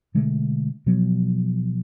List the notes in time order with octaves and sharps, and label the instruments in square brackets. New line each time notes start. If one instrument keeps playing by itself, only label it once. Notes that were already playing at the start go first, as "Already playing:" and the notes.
[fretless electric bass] B2 D3 G#3 A3
B2 F3 F#3 B3